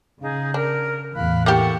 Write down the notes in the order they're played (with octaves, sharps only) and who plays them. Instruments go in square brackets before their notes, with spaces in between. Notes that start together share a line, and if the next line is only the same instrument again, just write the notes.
[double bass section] C#3 [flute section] D#4 G#4 F5
[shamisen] D4 [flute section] A#4
[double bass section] E2 A2 E3 [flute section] F5 B5 F#6
[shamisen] A#3 E4 G4 [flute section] A4 F#5 C#6